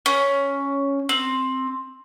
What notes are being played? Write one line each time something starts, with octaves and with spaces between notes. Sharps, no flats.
C#4
C4